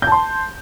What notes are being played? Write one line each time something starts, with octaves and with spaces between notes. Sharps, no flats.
A5 C6 G6